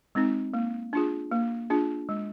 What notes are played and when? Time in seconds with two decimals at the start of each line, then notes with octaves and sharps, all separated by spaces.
0.15 G#3 C4 D#4
0.54 A#3
0.93 D4 F4 G#4
1.31 A#3
1.70 D4 F4 G#4
2.09 G#3